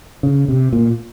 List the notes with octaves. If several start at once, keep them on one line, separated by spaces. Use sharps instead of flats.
C#3
C3
A#2